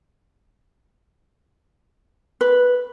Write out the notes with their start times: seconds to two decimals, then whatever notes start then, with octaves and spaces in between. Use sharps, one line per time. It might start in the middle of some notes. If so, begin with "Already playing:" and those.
2.41 B4